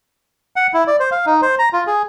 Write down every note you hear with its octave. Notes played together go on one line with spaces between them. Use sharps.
F#5
E4
D5
C5
F5
D#4
C5
A#5
F4
G#4